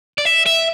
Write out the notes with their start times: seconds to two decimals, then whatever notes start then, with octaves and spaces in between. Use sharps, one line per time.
0.18 D5
0.25 E5
0.46 E5